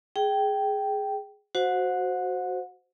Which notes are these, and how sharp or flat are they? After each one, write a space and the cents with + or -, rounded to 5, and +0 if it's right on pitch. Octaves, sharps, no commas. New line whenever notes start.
G#4 +5 G5 -5
F#4 +0 C5 +0 F#5 -35